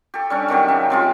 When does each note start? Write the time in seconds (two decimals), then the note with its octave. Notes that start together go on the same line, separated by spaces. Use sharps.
0.14 G4 A4
0.30 G3 C#4 D4
0.48 C3 D#3 F#3 G4
0.68 C#3 E5
0.90 C3 G#3 F4